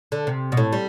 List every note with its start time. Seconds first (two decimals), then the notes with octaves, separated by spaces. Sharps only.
0.12 D3
0.27 C3
0.52 B2
0.57 A2
0.72 G3